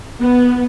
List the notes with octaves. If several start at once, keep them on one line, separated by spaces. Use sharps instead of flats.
B3